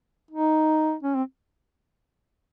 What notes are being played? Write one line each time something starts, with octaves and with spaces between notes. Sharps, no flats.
D#4
C#4
C4